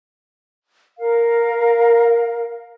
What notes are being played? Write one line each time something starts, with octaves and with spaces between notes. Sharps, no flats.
A#4 F5